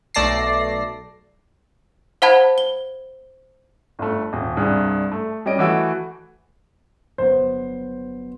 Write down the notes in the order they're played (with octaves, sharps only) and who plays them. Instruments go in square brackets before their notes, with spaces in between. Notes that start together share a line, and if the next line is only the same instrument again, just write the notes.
[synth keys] B1 A3 D5 A5 A#6 C7
[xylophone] C5 F5 F#5 A5 B5 G#6
G7
[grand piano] G1 A3
D#1
C2 G2 G#4
A3
G3 C#4 D#5 D7
E3 A3 F#4 E6 D7
[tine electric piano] G1 F#3 B3 [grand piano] C5